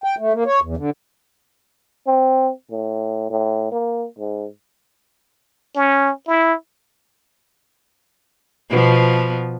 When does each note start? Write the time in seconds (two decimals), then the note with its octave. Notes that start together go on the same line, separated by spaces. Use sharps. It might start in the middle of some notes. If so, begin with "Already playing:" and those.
0.04 G5
0.19 A3
0.33 A#3
0.46 C#5
0.62 E2
0.77 D3
2.07 C4
2.71 A2
3.30 A2
3.71 A#3
4.19 G#2
5.76 C#4
6.28 E4
8.70 B2 F3 B3